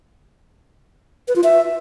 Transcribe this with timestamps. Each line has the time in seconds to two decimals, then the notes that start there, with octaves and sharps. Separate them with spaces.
1.28 B4
1.36 F4
1.44 E5